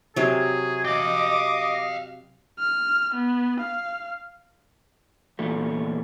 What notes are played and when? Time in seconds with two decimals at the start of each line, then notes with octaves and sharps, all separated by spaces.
0.16 C3 F#3 G#4
0.85 D#5 F5 G5 D6
2.60 F6
3.15 B3
3.60 F5
5.39 E2 A#2 A3